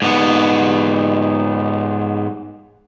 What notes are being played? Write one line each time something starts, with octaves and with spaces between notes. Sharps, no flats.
G#2 B3